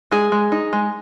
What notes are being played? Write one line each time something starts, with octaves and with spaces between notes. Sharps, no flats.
G#3 G#4
G#3
D#4
G#3